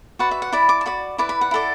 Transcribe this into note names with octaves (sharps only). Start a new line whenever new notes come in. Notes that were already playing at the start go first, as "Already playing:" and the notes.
F#4 B4 D5 F#5
E5
F#5
E4 D5 B5
D6
A5
F#4 D5 B5
E4 B4 D5 D6
B5
F#5
E4 A4 D5